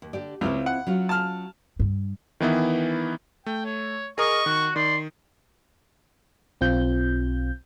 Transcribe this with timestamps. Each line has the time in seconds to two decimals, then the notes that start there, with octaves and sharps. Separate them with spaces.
0.02 D#2
0.13 D3 G4 D5
0.41 C#2 C4 E4 F4
0.66 F#5
0.87 F#3 C#4 F4
1.09 A5 F6
1.80 G2
2.40 D#3 E3 B3 E4
3.46 A3 G5
3.65 C#5
4.18 G#4 A#4 D#5 C#6
4.46 D#3 F#4
4.76 D#3 D5 C6
6.61 B1 C4 F4 G6